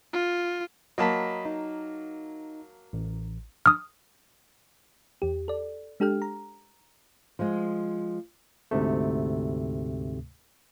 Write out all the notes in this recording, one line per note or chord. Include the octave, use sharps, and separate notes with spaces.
F4
F#3 A#3 D#5 A5 B5 B6
D#4
A1
D#6 F6
E2 G4
A4 D5
G#3 D4 G4 A4 G5 F6
A#5
F3 G#3
D2 G#2 C3 A3